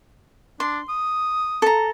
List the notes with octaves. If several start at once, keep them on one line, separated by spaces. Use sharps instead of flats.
D4 C6
D#6
A4 A#5